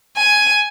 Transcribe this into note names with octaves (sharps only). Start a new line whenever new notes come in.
G#5